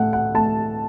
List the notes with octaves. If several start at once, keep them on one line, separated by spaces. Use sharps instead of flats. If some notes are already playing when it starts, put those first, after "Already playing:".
Already playing: A2 A3 F#5
F#5
A3 A5